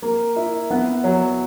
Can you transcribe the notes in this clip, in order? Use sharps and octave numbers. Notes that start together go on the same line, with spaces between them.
A#3
E4
B3
F#3